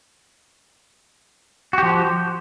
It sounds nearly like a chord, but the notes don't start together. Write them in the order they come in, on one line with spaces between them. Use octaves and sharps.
F#4 G4 F3